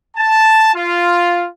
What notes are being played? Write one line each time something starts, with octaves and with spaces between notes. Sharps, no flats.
A5
F4